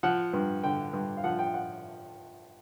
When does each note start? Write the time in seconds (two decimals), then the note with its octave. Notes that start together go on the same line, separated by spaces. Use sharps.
0.03 F3 F#5
0.33 G2
0.63 D3 G5
0.93 G2
1.17 F5
1.24 F3 F#5
1.39 G5
1.54 F#5